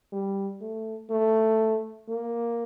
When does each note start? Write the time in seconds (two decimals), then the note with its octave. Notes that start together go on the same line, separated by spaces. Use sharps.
0.12 G3
0.61 A3
1.10 A3
2.09 A#3